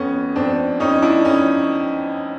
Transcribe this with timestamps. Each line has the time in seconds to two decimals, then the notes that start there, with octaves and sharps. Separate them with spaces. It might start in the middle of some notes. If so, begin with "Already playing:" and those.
Already playing: F2 B3 C#4
0.36 F2 C4 D4
0.80 F2 C#4 D#4
1.02 D4 E4
1.25 F2 C#4 D#4